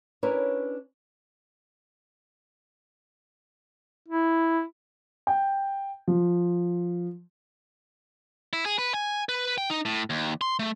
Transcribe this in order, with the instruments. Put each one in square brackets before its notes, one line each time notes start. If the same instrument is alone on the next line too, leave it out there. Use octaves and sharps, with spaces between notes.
[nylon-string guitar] C#4 D4 E4 A#4 B4 C#5
[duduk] E4
[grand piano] G5
F3
[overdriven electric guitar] E4
G#4
B4
G#5
B4
G5
D#4
A2
D#2
C6
A3